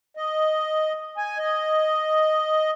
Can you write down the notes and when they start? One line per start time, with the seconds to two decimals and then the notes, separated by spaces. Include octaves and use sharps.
0.17 D#5
1.17 G#5
1.39 D#5